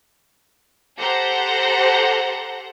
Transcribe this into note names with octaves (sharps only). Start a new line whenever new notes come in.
G4 A4 C5 F#5 A#5